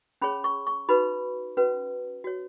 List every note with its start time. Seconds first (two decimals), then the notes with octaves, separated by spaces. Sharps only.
0.22 C#4 G#4 C#5 B5
0.44 C#6
0.67 C#6
0.89 D#4 F#4 B4 B5
1.57 C#4 F#4 B4
2.24 F#4 C#5